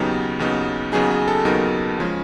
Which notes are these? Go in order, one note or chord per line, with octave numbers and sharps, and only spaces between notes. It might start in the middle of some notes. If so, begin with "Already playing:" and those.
Already playing: D#2 C#3 F#3 B3 D#4 G4
D#2 C#3 F#3 B3 D#4
D#2 C#3 F#3 B3 D#4 G#4
G#4
A4
D#2 C#3 F#3 B3 D#4 A#4
C#3 F3 G#3 C#4